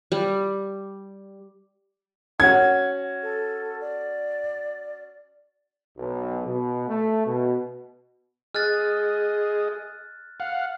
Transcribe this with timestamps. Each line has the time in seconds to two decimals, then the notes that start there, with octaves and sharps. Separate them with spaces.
0.12 G3
2.40 C#4 F#4 F#5 G#6
3.22 A4
3.81 D5
5.98 B1
6.45 B2
6.88 A3
7.26 B2
8.55 G#4 D#5 F6 F#6 A6
10.40 F5 F#5